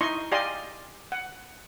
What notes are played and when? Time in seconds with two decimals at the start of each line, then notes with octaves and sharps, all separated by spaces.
0.01 D#4 E4 D#5 C6 C#6
0.32 G4 D5 D#5 F5 G#5 C6
1.12 F#5